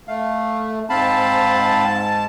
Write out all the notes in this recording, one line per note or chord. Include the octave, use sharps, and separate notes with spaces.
A3 F5
G#2 C4 F5 A5 B5